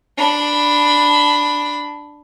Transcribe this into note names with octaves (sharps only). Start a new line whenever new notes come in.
D4 B5